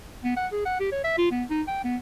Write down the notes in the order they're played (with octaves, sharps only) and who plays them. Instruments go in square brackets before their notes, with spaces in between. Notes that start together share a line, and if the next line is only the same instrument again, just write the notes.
[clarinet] B3
F#5
G#4
F#5
G4
C#5
E5
F4
B3
D#4
G5
B3